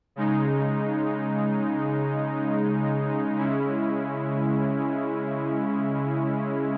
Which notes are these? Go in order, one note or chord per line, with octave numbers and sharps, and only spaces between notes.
C#3 G#3 D#4
C#3 G#3 C#4 E4